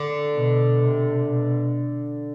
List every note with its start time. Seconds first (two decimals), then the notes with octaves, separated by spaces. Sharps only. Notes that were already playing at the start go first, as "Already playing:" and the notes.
Already playing: D3
0.35 B2
0.81 C3
1.25 B2